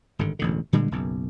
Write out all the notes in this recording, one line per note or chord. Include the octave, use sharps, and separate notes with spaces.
G#1 G2 D3
E1 A1 D3
A#2 D3 G3 G#3
F#1 B1 F#2